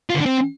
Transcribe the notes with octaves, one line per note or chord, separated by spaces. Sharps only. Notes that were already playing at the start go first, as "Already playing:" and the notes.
F4
D3
D4
C4